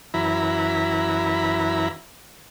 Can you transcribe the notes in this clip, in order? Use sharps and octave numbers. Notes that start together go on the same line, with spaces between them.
F#2 E3 E4 A#5 B5